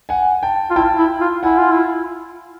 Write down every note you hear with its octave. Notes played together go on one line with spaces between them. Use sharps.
F#5 G#5
G5 A5
F4
E4 G5 A5
E4
F4
E4 F#5 G#5
F4
E4